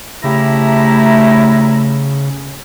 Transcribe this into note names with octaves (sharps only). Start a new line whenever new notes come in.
C#3 A3 E4 G4 A#5